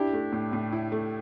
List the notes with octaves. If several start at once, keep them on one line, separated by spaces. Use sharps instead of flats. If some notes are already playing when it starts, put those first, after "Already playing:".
Already playing: D4 E4 G4
A3
A2
A2
E4
A3